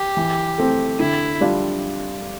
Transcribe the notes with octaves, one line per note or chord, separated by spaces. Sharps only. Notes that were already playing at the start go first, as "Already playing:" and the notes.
Already playing: G4
E3
A3 C4
D3 E4
G3 D4 F4